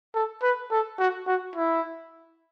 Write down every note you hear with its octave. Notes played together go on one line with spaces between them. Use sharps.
A4
B4
A4
F#4
F#4
E4